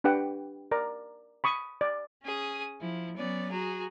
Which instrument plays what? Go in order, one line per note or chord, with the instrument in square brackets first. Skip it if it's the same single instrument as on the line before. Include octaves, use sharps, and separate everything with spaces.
[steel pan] D4 G4 B4 F#5 G5
A#4 D5 A#5
B5 C#6 D#6
D5
[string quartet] C#4 G#4 D#6
F3 E4
F#3 B3 C#4 D5
F#4 G#4 A#5